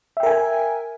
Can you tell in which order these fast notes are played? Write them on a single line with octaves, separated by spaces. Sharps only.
E5 G5 A#4 G#5